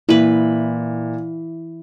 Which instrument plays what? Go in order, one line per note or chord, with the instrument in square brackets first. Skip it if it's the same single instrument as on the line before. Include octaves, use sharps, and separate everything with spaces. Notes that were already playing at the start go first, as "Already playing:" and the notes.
[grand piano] A#2 [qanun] E3 B4 [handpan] E4